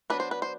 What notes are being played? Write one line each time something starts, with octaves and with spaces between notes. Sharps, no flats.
F#3 B3 D4 B4
C5
B4
C5